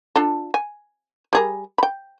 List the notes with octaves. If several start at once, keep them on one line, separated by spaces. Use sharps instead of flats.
D4 F4 A4
G#5
G3 G#4 A#4
G5 B5